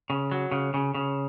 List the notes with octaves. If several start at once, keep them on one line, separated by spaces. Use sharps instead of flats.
C#3
F#3
C#3
C#3
C#3